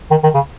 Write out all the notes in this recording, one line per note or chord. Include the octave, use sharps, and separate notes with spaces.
D#3
D#3
C#3